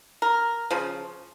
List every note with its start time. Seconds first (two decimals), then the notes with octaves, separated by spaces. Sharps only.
0.22 A#4
0.71 C#3 F3